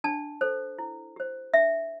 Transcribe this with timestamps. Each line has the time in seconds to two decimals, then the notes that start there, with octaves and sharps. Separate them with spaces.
0.04 D4 A5
0.41 A4 C5
0.78 E4
1.16 G4 C5
1.53 D4 E5